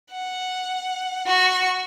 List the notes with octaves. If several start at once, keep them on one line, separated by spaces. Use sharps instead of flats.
F#5
F#4 C#6